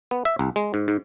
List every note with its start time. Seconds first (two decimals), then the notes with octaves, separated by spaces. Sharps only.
0.11 B3
0.25 E5
0.39 C2
0.56 G#3
0.74 G#2
0.88 G#2